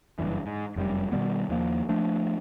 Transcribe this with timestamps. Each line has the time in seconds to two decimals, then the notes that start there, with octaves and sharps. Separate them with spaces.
0.19 F#1 C2 G2 E3
0.46 G#2
0.76 F1 F#2 C3 G3
1.12 B2 D#3 G3 B3
1.49 D#2 F3 A#3
1.89 F3 A3 D4